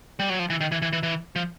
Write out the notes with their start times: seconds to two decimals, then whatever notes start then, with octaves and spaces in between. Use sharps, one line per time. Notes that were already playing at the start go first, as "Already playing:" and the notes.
0.20 G3
0.30 F#3
0.39 F3
0.50 E3
0.61 D#3
0.72 E3
0.82 E3
0.93 E3
1.03 E3
1.36 F3